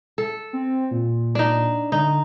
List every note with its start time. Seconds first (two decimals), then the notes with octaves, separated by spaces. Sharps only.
0.18 A4
0.53 C4
0.91 A#2
1.35 D4 D#4
1.92 D3 D#4